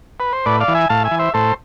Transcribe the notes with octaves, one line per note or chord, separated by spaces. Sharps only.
B4
C5
A2 B4 D5
D5 F5
E3
E5 G#5
A2 F5 A5
E5 G#5
E3
C5 E5
A2 A4 C5